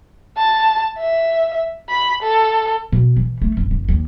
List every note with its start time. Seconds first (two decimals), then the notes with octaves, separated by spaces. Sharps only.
0.37 A5
0.99 E5
1.89 B5
2.23 A4
2.93 B2
3.17 E3
3.42 A3
3.57 F#1
3.71 F#1
3.88 D#2